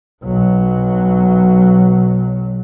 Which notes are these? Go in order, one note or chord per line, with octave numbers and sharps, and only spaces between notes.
B1 F#3